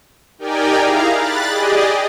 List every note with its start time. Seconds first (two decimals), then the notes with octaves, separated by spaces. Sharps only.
0.39 D#4 G4 A#4 D5 G5 G#5
0.76 E4 G#4 F5 A#5
1.13 B5 F#6 A6
1.47 G4 G#4 D5 D#5